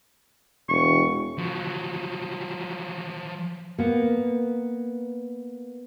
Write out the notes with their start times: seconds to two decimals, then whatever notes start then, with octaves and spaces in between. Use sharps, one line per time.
0.69 E1 C#6
1.38 F3 F#3
3.78 A#3 B3